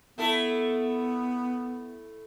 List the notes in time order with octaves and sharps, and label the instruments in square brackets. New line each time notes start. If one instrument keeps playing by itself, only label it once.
[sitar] A3 E4 A4 [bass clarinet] B3